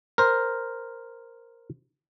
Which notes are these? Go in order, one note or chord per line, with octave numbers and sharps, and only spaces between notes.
A#4 C5